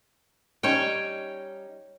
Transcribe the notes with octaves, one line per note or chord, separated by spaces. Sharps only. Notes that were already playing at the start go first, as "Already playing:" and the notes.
G3 C#4 D#4 C#5 G5